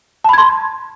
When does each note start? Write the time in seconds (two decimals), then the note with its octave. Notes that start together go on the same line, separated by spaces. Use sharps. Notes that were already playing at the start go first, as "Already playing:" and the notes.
0.24 A5
0.29 B5
0.33 G#6
0.38 C6